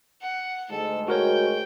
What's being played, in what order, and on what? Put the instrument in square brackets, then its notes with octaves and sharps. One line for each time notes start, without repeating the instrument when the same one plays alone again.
[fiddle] F#5
[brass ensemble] D2 G#2 G#3 [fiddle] A4
[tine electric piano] F#4 A#4 C#5 [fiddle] G5